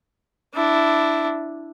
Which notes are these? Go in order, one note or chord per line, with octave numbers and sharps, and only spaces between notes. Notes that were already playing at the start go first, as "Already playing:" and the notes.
D4 E4